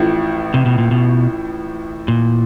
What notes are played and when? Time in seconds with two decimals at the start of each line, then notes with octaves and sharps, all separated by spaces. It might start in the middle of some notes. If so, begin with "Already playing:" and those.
Already playing: A1 A2 F3
0.54 C3
0.66 B2
0.78 A#2
0.91 B2
2.08 A#2